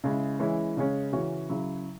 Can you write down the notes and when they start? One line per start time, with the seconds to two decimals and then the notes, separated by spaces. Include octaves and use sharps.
0.04 C#3 G#3 E4
0.39 E3 G#3 C#4 E4
0.77 C#3 G#3 C#4
1.12 C#3 E3 C#4 F#4
1.49 C#3 F#3 E4